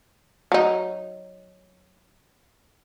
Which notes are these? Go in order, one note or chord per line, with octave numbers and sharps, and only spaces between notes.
F#3 D#4